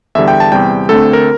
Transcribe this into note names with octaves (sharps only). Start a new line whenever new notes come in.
E2 D3 G3 E5
G5
A5
E2 C3 G3 G5
D2 D3 A3 C4 A4
A#4